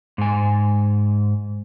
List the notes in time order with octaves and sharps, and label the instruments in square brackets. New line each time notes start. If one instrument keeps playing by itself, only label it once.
[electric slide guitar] G#2 G#5